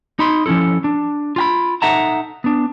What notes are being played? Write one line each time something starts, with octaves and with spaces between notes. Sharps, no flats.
D#4 B5 C6
F3 C#4 D4 E4 A4
D4
F4 G5 B5
D#4 A4 E5 F#5 A5 A#5
B3 D4